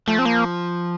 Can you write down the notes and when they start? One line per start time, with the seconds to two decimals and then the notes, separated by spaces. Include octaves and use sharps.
0.08 F3 A3
0.19 C4
0.25 A#3